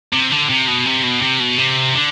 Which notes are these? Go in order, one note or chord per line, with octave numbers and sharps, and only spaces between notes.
C3
D3
C3
B2
C3
B2
C3
B2
C3
D3